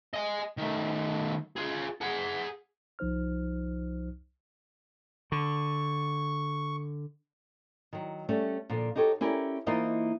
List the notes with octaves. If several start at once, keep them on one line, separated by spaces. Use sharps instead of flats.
D#5 G#5
D#3 A3
F4 G#4
G#4 F#5
C2 F3 D#4 C5 F6
D3 C#6
D#3 F#3
G3 A3 C#4 C#5 E5
A#2 D3 F3
D#4 F#4 G4 A4 C#5
C#4 E4 G4 A4 A#4 D5
E3 A#3 D#4 F4 C5 D#5